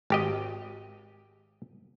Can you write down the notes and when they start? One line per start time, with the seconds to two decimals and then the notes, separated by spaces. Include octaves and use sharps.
0.10 G#1 G4 D#5